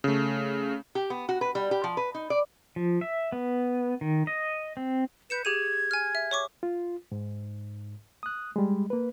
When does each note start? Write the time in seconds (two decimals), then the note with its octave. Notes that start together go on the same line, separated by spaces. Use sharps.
0.04 C#3 A3
0.95 G4
1.10 B3
1.29 F#4
1.41 B4
1.55 G3
1.71 G4
1.84 F3
1.97 B4
2.14 D#4
2.30 D5
2.76 F3
3.01 E5
3.32 B3
4.01 D#3
4.27 D#5
4.77 C4
5.30 B4 G6 C#7 E7
5.45 G4 G#4 G#6 D#7
5.91 G#5 F6
6.15 E5
6.31 C#5 C#6 D6
6.63 F4
7.12 G#2
8.23 D#6 F#6
8.56 G3 G#3
8.90 A#3 B4